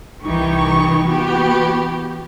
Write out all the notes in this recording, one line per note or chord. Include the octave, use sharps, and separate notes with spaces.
C2 D#3 E3 D#4 G4 C#6
E3 B3 F#4 G4